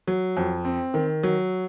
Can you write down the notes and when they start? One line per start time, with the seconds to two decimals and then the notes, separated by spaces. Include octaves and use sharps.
0.07 F#3
0.37 F2
0.65 C4
0.94 D#3
1.23 F#3